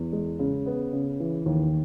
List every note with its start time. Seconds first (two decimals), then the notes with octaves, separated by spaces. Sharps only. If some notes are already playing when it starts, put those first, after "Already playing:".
Already playing: E2
0.12 G#3
0.39 C#3
0.66 B3
0.93 C#3
1.20 E3
1.46 D#2